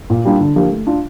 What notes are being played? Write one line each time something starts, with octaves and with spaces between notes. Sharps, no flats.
A#2
G3 A#3 D4 F4
D3
F3 A#3 D4 G4
A3
D4 F4